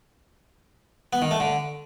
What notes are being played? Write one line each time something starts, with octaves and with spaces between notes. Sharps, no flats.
B3
D#3
A3
D3